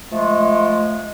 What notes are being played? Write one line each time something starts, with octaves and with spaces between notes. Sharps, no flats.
F3 G#3 A3